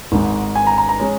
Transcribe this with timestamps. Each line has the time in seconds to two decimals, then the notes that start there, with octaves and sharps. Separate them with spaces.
0.12 G#1 G#2 G#3
0.56 G#5
0.67 A#5
0.78 A#5
0.89 A#5
1.00 G#3 C#4